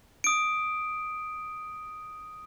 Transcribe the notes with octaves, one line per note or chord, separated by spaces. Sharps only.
D#6 D7